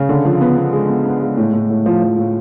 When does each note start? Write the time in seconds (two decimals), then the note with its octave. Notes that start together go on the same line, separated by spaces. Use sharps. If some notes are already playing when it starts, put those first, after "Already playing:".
Already playing: C#3
0.09 D3
0.25 F3
0.41 B3
0.57 B3
0.73 G#3
0.89 B3
1.05 B3
1.22 G#3
1.37 A2
1.53 A2
1.70 A2
1.86 F3
2.02 F3
2.18 A2